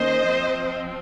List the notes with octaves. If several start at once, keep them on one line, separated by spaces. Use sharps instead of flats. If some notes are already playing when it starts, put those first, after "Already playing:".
Already playing: D#3 A#3 C#4 C5 D#5
F3 C4